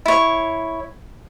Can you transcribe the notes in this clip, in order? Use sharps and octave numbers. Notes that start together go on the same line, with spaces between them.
E4 C#5